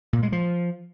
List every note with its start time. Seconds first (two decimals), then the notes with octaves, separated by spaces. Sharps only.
0.13 A#2
0.23 G#3
0.32 F3